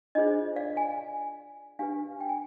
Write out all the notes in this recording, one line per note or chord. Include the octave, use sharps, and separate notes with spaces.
D4 F4 G#4 C5 D#5
D5 F5
F5 G#5
D4 G4 B4 F5 G#5
G5
G#5